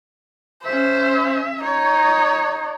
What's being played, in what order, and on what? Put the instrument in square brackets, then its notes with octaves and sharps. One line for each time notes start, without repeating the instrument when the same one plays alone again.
[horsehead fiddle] C#4 E5 [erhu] C5
[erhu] D#4 [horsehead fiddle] C#5